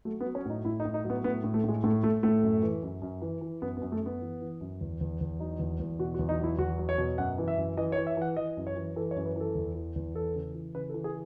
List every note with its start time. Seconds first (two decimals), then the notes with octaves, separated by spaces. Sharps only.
0.05 F#3 A3
0.20 B3
0.25 F#3
0.35 C#4
0.45 A2 D#4
0.65 A2 E4
0.80 D#4
0.85 A2
0.94 D#4
1.04 F#3
1.10 B3
1.24 A2 B3
1.44 A2
1.54 A3
1.64 A2 G#3
1.84 A2 A3
2.03 A2 A3
2.23 A2 A3
2.43 F#2
2.63 E3
2.83 F#2
3.02 F#2
3.22 E3
3.41 E3
3.62 F#2 B3
3.77 B3
3.82 F#2
3.92 A3
4.01 F#2 B3
4.21 E3
4.41 E3
4.61 F#2
4.81 E2
5.01 E2
5.21 E2
5.40 F#3 D#4
5.59 E2
5.80 E2
5.99 B2 F#4
6.14 F#4
6.19 E2
6.29 D#4
6.39 F#3 E4
6.58 E2 F#4
6.78 F#3
6.89 C#5
6.98 B2
7.18 F#2 F#5
7.38 E3
7.48 E5
7.58 F#2
7.77 E3 D#5
7.92 C#5
7.97 E3
8.07 E5
8.17 E3 F#5
8.37 E3 D#5
8.57 F#2
8.67 C#5
8.77 E3
8.96 E3 A4
9.11 C#5
9.16 F#2
9.26 B4
9.36 E3 A4
9.55 E2
9.75 E3
9.96 E2
10.15 E3 A4
10.35 C#3
10.54 E3
10.75 C#3 B4
10.89 A4
10.94 E3
11.04 G#4